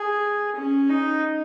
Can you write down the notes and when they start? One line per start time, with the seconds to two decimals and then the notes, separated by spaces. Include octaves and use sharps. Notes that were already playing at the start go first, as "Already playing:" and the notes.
Already playing: G#4
0.56 C#4
0.89 D#4